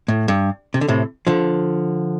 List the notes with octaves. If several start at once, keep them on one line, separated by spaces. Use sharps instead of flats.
A2
G2
C3
D3
A2 C3
D3 F3